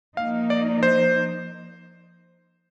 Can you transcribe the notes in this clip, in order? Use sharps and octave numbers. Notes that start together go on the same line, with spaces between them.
F3 A#3 D#4 F5
D5
C5